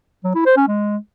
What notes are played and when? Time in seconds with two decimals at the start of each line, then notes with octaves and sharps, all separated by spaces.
0.24 F#3
0.35 E4
0.46 C5
0.57 C#4
0.68 G#3